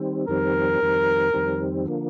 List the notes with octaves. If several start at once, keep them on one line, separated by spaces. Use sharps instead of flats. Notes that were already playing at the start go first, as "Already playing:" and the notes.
Already playing: D#3 G3 C4
F2 D#3 G3 C4 A#4
F2 D#3 G3 C4
F2 D#3 G3 C4
D3 F3 A#3